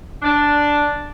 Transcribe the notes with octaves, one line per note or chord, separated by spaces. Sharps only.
D4